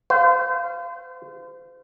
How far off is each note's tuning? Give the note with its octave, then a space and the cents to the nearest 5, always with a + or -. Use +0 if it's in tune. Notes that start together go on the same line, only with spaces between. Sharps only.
C5 -40 F5 -15